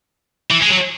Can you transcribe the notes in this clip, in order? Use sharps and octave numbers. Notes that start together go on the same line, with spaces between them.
E3
G#3
F#3